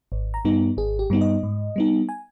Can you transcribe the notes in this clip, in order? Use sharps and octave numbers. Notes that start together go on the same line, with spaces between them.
G#1
A#5
G2 G3 B3 D#4
G#1 G#4
G4
G2 G3 B3 D#4
D#5
G#2
G3 B3 D#4
G#5